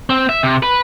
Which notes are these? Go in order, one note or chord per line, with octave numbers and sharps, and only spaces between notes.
C4
E5
C3
B4